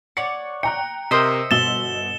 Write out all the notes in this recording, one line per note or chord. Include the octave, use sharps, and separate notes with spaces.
C#5 D5 F#5 C#7
G5 A#5 F#6 C#7
C3 A#4 C5 D#5 E5
G1 B2 E6 A6 E7 G7